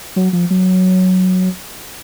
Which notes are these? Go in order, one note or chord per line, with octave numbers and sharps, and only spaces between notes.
F#3
F3
F#3